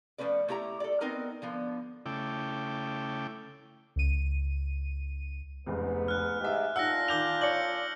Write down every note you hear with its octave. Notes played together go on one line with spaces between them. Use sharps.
F3 G#3 A3 C#4 B4 D5
A3 E4 G4 F5 A#5
A4 D5
B3 C4 D#4 A#4 B4
D3 F3 B3
C#3 A3 E4 G5 D6
C#2 D#7
F1 C#2 G#2 B3
F6 F#6
G#2 E3 G#3 G4 E5
A#2 D4 D#4 F4 F#5 E6 F#6 A#6
D#3 D6 F6 G6 F7 G7
C#5 D5 C#7 F#7